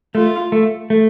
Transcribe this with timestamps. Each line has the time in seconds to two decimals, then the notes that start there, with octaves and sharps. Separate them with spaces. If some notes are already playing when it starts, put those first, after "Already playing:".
0.15 A3 F4
0.52 A3
0.90 A3